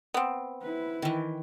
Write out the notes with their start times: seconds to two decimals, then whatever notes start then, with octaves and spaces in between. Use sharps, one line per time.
0.14 B3 C4
0.61 E4 B4
1.02 D#3 E3